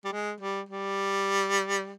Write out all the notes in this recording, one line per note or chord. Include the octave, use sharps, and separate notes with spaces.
G3
G#3
G3
G3